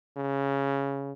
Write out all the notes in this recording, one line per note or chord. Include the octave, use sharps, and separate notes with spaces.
C#3